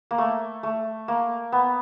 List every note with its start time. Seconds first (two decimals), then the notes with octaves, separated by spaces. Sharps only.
0.11 A#3
0.18 A3
0.63 A3
1.08 A#3
1.52 B3